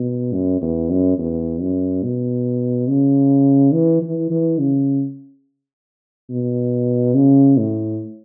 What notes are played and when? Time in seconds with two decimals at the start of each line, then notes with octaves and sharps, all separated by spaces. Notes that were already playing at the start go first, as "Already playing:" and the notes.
Already playing: B2
0.33 F#2
0.62 E2
0.90 F#2
1.18 E2
1.61 F#2
2.03 B2
2.89 C#3
3.73 E3
4.02 E3
4.30 E3
4.59 C#3
6.29 B2
7.14 C#3
7.57 A2